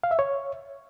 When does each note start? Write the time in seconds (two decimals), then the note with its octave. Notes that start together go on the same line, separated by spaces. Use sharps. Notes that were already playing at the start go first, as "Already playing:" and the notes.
0.04 F5
0.11 E5
0.19 C#5